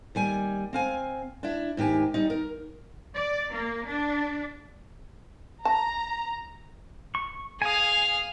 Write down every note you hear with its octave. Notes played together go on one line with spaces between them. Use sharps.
D#2 G3 G#5
C4 F5 G#5
D4 E4
G#2 D#3 G4 G#5
G3 D#4
A#4
D5
A#3
D4
A5 A#5
C#6
G#4 F5 G#5 D#6